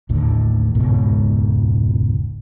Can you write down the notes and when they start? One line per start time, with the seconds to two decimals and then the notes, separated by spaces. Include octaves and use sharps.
0.09 A1 D#2 A2 D3
0.75 E1 C#2 G#2 B2